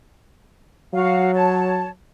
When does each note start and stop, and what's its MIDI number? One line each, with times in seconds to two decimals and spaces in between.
0.94 1.90 54
0.94 1.31 66
0.94 1.31 77
1.34 1.89 73
1.34 1.89 81